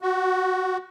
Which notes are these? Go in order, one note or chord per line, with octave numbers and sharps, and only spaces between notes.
F#4